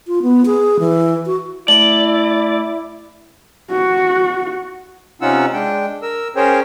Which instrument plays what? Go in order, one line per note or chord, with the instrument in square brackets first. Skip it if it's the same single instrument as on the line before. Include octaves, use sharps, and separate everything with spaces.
[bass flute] F4
B3
G#4
E3
F#4
[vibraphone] A3 [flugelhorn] E4 [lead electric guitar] D5 [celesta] F#7
[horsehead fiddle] F#4
[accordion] C3 C#4 D#4 F4 F#5 E6
G#3 D4 G5
A#4 E6
C#4 G#4 A#4 C5 C#5 G5